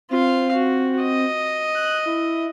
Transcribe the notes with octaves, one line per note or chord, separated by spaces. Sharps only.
C4 F4 F5
F#4
D#5
F#6
E4